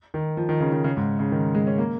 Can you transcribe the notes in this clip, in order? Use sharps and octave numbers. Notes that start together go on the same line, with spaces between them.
D#3
F3
D#3
C#3
D#3
C#3
G#2
C#3
D#3
G#3
C#4
A#3